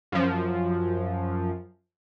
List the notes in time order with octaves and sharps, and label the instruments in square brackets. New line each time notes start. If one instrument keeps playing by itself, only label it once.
[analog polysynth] F#2 F3